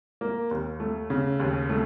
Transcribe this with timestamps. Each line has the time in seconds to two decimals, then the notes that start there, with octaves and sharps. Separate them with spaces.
0.21 A#3
0.51 D#2
0.80 A3
1.10 C#3
1.40 D#2
1.70 A3